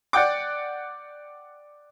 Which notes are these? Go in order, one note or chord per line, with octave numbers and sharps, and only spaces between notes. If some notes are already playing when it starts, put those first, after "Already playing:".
D5 F#5 G5 D6